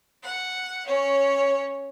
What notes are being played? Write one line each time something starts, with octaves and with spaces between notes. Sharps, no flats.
F#5
C#4 C#5